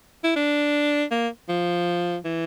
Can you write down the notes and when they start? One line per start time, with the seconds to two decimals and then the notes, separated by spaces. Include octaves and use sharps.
0.24 E4
0.36 D4
1.11 A#3
1.49 F3
2.25 E3